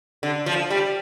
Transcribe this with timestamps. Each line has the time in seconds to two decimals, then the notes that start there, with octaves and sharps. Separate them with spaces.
0.23 D3
0.46 F3
0.70 G3